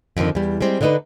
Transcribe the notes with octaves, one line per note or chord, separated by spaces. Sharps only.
F2 D3 D#3
E2 G3
G3 G#3 C4
D3 D4 D#4 A4 B4